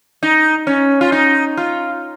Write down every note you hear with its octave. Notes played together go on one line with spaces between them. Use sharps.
D#4
C#4
F4
D#4
F4